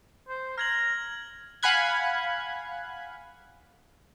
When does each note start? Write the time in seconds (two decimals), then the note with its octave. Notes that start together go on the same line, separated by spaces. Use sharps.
0.28 C5
0.58 A#5 F6 G#6 F#7
1.63 F5 F#5 G#5 B5 F#6 G#6